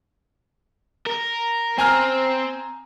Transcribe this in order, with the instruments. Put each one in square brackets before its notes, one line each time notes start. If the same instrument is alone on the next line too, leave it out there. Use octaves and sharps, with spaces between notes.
[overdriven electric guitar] A#4
[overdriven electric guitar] C4 [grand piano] G#5 A#5 F6